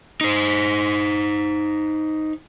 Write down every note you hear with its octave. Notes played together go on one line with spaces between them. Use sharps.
D#4 C5